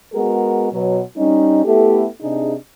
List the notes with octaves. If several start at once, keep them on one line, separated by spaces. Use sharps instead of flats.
G#3 B3 F#4 G#4 A#4
B2 F#3
G3 C#4 D#4
A3 B3 E4 G4 A4
C3 D4 D#4 G#4